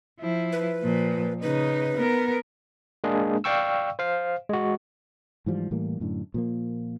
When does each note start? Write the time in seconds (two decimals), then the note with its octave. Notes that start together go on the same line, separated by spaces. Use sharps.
0.20 F3 E4
0.52 B4
0.82 A#2 F3
1.42 C#3 D#4 B4
1.97 B3 A#4
3.04 G#3 A#3 D4 G#4
3.44 D5 F5 G5 C#6 E6
3.99 C5 F5
4.49 G#3 F#4
5.46 G#2 E3 F3 G3
5.71 A2 E3 G3 A#3
6.00 F#2 A2 D3
6.34 A#2 F3 A#3